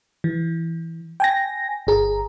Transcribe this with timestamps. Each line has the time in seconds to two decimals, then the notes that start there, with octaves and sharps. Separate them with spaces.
0.24 E3
1.20 G5 G#5 A#6
1.87 G1 G#4 A#5